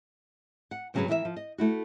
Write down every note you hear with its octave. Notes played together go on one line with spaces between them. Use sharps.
F#5
G2 C#3 F#3 B3 G#4 B4
E3 E4 A#4 D#5 E5
F3
D#5
A3 E4 F#4